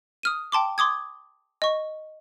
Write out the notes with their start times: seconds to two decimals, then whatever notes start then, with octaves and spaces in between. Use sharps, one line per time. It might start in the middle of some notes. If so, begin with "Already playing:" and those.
0.23 D#6 F6 D#7
0.52 G5 A5 C6 D6
0.78 C6 D6 D#6 G#6
1.62 D#5 C#6